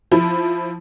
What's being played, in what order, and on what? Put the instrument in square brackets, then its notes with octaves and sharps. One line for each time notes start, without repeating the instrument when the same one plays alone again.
[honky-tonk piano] F3 E4